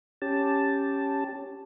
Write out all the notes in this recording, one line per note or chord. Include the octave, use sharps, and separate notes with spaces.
C#4 G4 A5